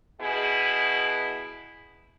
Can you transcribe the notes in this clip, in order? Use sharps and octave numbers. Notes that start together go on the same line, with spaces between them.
B2 E4 G#4